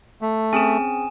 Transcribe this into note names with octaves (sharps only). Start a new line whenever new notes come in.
A3
C4 C#4 G#4 G#5 E7